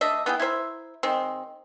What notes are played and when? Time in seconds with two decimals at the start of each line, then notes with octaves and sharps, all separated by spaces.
0.01 A3 D4 D#5 E5
0.26 B3 E4 G#4 G5
0.40 E4 A#4 C5 E5
1.03 D#3 G#3 C4